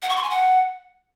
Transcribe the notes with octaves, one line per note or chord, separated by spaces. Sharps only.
F#5
C#6
C6
G#5
F#5